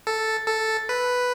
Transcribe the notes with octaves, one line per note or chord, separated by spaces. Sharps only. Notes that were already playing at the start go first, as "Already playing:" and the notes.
A4
A4
B4